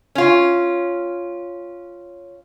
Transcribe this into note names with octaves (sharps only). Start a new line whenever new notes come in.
C#4 F4